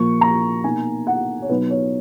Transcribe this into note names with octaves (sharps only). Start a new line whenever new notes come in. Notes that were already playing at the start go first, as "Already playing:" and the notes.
Already playing: A#2 F3 A#3 C#6
A#5
B2 A#3 D#4 G#5
F#5
C#5
B2 F#3 B3 D#4 B4
C#5